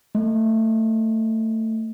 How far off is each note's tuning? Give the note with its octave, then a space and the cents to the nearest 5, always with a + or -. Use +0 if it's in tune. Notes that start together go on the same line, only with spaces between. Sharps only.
A3 +20